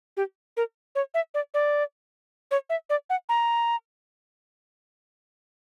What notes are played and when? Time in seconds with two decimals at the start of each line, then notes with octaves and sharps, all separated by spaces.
0.17 G4
0.57 A#4
0.95 C#5
1.14 E5
1.34 D5
1.54 D5
2.51 C#5
2.70 E5
2.90 D5
3.10 F#5
3.29 A#5